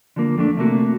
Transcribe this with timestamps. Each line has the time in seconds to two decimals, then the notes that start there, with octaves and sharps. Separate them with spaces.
0.16 D3 F3 A#3
0.38 F2 A3 D4
0.57 C3 A3 A#3 F#4